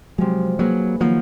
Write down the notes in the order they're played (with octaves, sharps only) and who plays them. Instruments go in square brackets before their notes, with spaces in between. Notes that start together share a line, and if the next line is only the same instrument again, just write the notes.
[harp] C3 F3 G#3 [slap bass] F#3
[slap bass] F#3 [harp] A#3 D#4 G#4 B4
[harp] D#3 F#3 A#3 D#4 F#4 [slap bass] F3